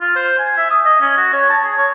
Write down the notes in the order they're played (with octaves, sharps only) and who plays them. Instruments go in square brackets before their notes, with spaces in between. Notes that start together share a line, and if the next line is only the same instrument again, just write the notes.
[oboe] F4
C5
G#5
E5
D#6
D#5
C#4
F#4
C#5
A5
G#4
C#5